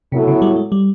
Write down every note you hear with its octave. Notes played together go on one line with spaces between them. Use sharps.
A2 C3 F#3 B3 E4 A4
C#3
G3
G#3
G3